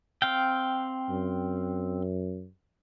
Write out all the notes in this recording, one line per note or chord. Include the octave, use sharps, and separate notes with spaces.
C4 F5 G5
F#2